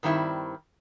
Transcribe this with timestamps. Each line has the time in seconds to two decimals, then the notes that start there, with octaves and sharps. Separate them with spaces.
0.03 G2 D#3 G3 C4 E4